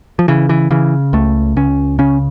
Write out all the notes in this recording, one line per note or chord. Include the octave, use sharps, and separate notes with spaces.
F3
C#3 E3
E3
C#3 E3
C#2 A3
C#2 C#4
C#3 C#4